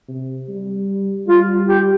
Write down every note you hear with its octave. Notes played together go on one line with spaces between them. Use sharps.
C3
G3
G3 F4
G4